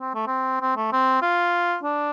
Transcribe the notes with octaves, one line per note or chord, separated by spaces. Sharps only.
C4
A3
C4
C4
A3
C4
F4
D4